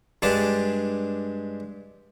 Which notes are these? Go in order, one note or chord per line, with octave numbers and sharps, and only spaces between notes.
G2 G#3 D4 A5